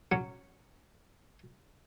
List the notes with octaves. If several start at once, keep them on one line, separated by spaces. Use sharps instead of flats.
F#3 C#4